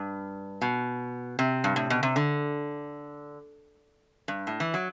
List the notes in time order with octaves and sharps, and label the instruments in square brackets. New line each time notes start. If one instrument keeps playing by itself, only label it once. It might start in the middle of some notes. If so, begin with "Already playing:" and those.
Already playing: [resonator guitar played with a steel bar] G2
B2
C3
G2
A2
B2
C3
D3
G2
A2
E3
F#3